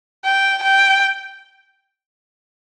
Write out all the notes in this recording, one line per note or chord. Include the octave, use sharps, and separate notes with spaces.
G5
G5